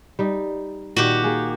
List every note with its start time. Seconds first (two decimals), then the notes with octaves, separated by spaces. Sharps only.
0.19 G3 D#4
0.96 A#2 D#3 F#4 G4
1.24 A#3 G#4